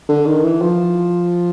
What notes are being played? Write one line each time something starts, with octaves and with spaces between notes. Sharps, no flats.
D3
D#3
E3
F3